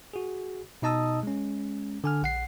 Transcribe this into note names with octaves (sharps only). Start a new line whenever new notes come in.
F#4 G#4
B2 D#4 D#5 A5 D#6 E6
G#3 C#4
D3 G#5 F6
A#1 F#5 C7